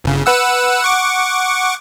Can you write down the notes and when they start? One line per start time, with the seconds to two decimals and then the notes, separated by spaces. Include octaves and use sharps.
0.04 G1 C#3
0.26 B4 F#5 E6
0.83 F#5 C#6 D6